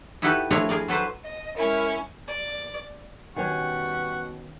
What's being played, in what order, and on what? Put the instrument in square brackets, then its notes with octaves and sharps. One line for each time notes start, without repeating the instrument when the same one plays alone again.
[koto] D#4 E4 F#4 G4 A4 B4
F3 A3 D4 E4 A#4 C#5
G#4 A#4 D5
F#3 A4 B4 C5
[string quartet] D#5
[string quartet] G#3 C#4 E4 [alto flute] A#4
[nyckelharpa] D5
[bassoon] B2 [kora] D#3 C#4 [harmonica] G3 F#5 C#6